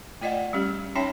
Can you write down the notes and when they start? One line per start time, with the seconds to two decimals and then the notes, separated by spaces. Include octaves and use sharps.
0.21 A3 F4 D5 D#5 F#5 G5
0.53 G3 C#4 G4
0.95 C#4 D#4 C#5 E5 G5 A5